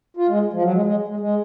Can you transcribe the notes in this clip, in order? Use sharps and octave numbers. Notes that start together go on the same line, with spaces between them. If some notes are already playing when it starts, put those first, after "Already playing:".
F4
G#3
F3
F#3
G#3
G#3
G#3
G#3